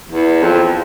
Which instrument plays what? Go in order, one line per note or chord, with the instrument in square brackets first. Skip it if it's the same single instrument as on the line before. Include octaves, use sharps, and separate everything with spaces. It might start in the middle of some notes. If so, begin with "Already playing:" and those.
[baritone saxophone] E2
F2